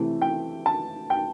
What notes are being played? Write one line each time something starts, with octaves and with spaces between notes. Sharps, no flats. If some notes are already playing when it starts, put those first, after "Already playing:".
Already playing: C3 E3 A3
G5
A5
G5